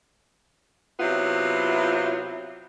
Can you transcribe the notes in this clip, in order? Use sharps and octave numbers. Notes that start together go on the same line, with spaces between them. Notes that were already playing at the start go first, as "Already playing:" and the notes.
C3 F#3 B3 E4 F4